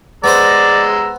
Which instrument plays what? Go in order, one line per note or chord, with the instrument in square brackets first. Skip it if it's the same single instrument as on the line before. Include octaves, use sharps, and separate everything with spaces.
[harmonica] G#3 A#5 E6 [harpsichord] B3 C5 [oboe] D5